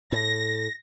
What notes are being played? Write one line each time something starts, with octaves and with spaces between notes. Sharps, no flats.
A2 A#6